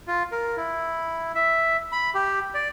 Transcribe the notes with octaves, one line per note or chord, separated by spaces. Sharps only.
F4
A#4
E4
E5
B5
G4
D5